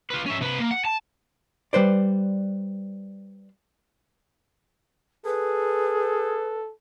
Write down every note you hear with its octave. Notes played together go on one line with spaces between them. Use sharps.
F4 B4
C#4 E5
C3 B4
A#3
F#5
A5
G3 B4 C5 D5
G#4 A4 B4